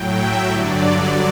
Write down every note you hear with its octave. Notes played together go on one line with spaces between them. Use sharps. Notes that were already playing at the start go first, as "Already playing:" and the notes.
Already playing: A2 F#3 G5
E5
G2 D3 F#3 D5